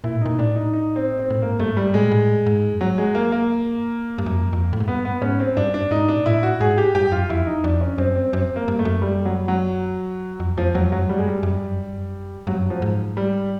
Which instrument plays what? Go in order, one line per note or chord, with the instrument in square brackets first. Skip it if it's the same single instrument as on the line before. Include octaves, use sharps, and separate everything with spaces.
[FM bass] A#2 [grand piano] E4
[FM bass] A2
[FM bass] A#2 [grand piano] D#4
[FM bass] A2 [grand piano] D4
[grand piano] D#4
D#4
C4
C4
[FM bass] A2
[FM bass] G#2 [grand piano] A#3
[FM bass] G2 [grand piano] A3
[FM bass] G#2
[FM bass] G2 [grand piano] G3
[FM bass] A2 [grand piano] G#3
[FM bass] A#2
A2
G#2
F#2
[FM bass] G2 [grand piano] F#3
[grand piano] G#3
A#3
A#3
[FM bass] G2
F#2
F2
F#2
F2
A2
G#2
[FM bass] G2 [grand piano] B3
[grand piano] B3
[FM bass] G#2 [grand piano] C#4
[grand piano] C4
[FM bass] G2 [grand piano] D4
[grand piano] D4
[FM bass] G#2 [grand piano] D#4
[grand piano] D4
[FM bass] A#2
[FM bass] A2 [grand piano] E4
[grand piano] F#4
[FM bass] G#2 [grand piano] G#4
[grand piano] G4
[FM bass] G2 [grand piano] G4
[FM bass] F#2 [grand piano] F4
[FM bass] F2 [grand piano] E4
[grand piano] D#4
[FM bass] F2 [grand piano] D4
[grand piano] C#4
[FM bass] F#2 [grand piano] C4
[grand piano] C4
[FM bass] G2
[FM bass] F#2 [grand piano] C4
[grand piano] A#3
[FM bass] G2
[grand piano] A3
[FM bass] F#2
[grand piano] G3
F#3
F#3
[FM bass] F2
[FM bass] F2 [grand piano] F3
[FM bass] F2 [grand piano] F#3
[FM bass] F#2 [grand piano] F#3
[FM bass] G2 [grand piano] G3
[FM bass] F#2 [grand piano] G#3
[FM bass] G2 [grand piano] G3
[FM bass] F#2
G2
F#2
G2
F#2
[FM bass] G2 [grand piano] F#3
[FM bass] F#2
[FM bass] G2 [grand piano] F3
[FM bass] G#2
[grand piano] G3